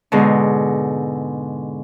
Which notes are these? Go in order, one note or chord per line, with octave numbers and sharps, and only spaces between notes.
G#2 B2 D3